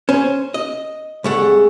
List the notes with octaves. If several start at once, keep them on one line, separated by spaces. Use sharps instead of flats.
C#4 C5
D#5
C2 G#3 A3 F#5